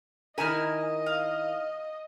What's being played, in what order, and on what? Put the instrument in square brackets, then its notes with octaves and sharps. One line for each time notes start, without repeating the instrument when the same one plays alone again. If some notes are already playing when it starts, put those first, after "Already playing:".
[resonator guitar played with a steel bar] D#3 E4 A#4 [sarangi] D#5 [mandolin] G#5 F6
[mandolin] F5